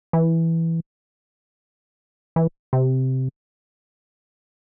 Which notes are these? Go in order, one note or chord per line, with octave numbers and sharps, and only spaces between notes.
E3
E3
C3